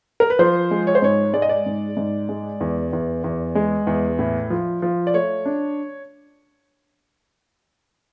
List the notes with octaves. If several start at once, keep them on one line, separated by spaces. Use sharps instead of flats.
A#4
B4
F3 C5
G#3
C#5
C5
G#2 C#5
G#3 D5
D#5
D5
G#2
G#2
G#3
E2
E2
E2
G#3
E2
A2
F3
F3
D5
A3 C#5
D4